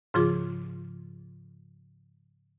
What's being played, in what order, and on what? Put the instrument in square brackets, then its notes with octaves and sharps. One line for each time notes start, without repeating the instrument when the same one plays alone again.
[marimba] G#2 C#3 F3 F4 G#4 D6